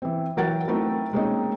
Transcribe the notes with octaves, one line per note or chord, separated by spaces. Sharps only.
E3 C4
E3 F#3 A#4 F#5 G5 A6
F#3 A3 C4 D#4 E4 A#4
G#3 A#3 C4 C#4 D#4 D#5